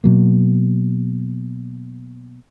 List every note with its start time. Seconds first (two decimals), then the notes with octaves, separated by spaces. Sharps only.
0.04 B2 F#3 A#3